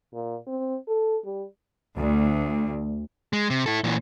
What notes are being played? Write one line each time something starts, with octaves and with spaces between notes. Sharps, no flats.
A#2
C4
A4
G3
D2
G#3
C3
E4 A4
A#2 E3